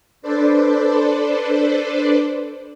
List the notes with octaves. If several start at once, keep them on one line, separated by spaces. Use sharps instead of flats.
D4 A4 B4 C5 D5